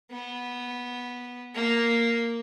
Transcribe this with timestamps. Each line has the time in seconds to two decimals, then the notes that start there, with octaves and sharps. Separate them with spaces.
0.11 B3
1.54 A#3